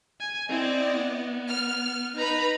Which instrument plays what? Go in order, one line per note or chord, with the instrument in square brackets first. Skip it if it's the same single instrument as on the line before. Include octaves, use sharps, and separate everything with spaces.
[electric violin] G#5
[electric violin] C4 E4 [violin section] D5 D#5
[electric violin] B3
[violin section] F6
[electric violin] D#4 A#5 [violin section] B4 B5